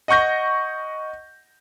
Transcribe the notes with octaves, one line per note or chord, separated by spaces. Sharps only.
D#5 F#5 C#6 G6 A#6